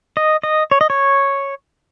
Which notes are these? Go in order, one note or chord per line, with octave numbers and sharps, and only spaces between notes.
D#5
D#5
C#5
D#5
C#5